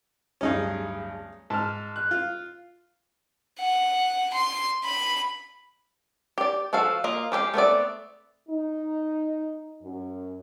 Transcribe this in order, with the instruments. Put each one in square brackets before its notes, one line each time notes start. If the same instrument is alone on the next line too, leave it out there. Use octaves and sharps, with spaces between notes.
[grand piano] D1 G2 [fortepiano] C#4 D#4 G#4
[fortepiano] G#2 [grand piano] A5 F6
[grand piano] F#6
[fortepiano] F4
[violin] F#5
C6
B5
[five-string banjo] G4 D5
F3 F#4 A4 F5
A#3 F4 D#5
G#3 G4 B4 F5
A3 B3 C4 D5
[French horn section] D#4
F#2